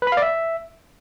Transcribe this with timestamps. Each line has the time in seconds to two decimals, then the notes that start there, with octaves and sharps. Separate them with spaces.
0.02 B4
0.07 B5
0.12 F5
0.17 D5
0.22 E5